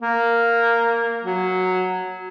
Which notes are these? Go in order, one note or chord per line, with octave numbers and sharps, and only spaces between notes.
A#3
F#3